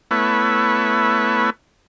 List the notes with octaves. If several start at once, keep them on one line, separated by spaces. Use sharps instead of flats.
A3 B3 E4 B4 C#5